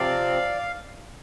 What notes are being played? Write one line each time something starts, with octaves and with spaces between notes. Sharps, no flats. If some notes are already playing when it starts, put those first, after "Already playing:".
Already playing: C3 F3 C4 D5 F5